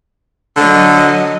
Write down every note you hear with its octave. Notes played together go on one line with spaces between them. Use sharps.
D3 F#3 D#5